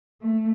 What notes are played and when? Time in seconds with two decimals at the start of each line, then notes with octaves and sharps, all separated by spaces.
0.21 A3